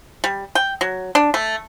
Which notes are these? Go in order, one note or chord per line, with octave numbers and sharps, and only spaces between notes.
G3
G5
F#3
D4
A3